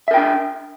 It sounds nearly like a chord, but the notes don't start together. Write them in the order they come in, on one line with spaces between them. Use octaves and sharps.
E5 A#4 G5 D4